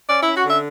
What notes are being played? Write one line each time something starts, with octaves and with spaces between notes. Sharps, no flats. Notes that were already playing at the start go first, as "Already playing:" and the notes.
C#4 D5
C#4 E4
F#4
D3 E5